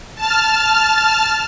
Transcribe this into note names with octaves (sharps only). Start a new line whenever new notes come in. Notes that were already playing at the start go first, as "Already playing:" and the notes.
A5 F6